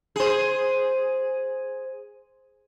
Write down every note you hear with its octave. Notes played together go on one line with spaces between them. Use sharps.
G#4 C5